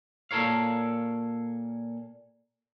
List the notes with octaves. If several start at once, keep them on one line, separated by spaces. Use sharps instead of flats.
A#2 A4 A#4 C#5 F5